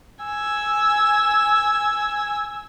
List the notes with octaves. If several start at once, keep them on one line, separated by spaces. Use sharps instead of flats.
G#5 E6